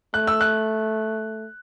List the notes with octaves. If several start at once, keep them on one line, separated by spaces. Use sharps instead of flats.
A3 F#6
E6
F#6